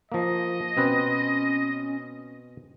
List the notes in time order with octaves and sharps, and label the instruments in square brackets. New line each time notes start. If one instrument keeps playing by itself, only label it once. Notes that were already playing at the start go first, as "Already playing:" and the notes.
[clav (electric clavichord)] F3 A#3 [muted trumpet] D#5
[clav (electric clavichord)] B2 C4 B4 [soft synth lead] C#4